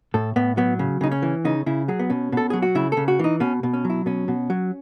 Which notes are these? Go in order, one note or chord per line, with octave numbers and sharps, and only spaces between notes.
A2 A4
A2 B3
F#3 B3
C#3
C#3 D#4
C#4
E3
C#3 D#4
C#3 E4
F#3 G#4
B3
B2 C#4
B2 A4
F#3 G#4
F#4
C#3 E4
C#3 A4
F#4
E3 D#4
B2 C#4
B2
C#4
F#3
E4
B2 C#4
B2
F#3